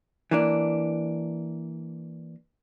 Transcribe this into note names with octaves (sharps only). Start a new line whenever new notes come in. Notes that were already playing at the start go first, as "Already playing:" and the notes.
E3 A#3 D4